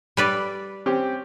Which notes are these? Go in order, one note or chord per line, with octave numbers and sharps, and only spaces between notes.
G3 B4 D5
C4 C#4 G4